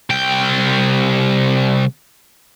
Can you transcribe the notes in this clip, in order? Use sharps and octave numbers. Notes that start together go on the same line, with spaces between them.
C2 G5